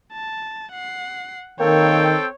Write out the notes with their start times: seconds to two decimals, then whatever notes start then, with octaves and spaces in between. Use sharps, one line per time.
0.12 A5
0.72 F#5 C7
1.60 D#3 A#3 C4 A4 C#5 G5